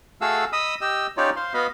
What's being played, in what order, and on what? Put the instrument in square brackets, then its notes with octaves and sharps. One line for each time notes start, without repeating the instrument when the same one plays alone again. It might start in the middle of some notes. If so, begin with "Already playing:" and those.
[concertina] A3 F#4 G#4 A4 F5 E6
D#5 B5 D#6 E6
G4 D#5 E6
C#4 D#4 F4 G4 C#5 D5
C5 F5 C6
B3 F#4 D#5 F5 B5